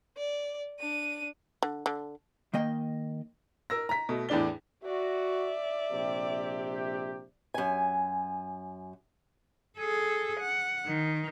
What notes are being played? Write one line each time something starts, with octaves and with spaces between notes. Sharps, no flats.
D5
D4 D#7
D3
D3
D#3 A#3 D#5 G5
A#4 E6 A#6
A#5 B6
B2 A3
E2 A2 D4 D5 G7
F#4 D5 E5
A#1 C3 G4
F#2 G#5
G#4 A4
F#5
D#3